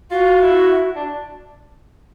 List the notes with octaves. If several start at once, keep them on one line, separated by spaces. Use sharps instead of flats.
F4 F#4
E4
D4